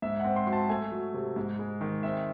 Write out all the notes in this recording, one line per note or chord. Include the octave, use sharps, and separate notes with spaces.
G#2 E5
F#5
C4
C6
F#3 C6
A5
A3 G#5
F#3
C3
G#2
G#3
D#3
C4 E5